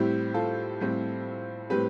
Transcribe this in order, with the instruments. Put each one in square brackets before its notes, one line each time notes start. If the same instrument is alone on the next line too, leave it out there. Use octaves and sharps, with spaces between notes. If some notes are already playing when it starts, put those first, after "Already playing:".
Already playing: [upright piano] A2 G3 C4 E4 G4
F4 A4
A2 G3 C4
A2 G3 C4 G4 B4